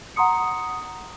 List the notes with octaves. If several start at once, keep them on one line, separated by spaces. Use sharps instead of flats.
F#5 A#5 C6 D#6 C#7